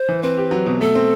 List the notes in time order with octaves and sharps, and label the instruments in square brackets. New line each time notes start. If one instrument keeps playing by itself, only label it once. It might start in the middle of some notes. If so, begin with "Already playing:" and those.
Already playing: [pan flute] C5
[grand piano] E3
[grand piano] C4 [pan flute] B4
[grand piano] G4
F#3
B2
[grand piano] A3 [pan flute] A4
[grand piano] C4